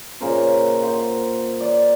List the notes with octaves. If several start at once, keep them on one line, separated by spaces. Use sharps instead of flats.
A#2 C#3 A#4 C5
C5 F#5
D5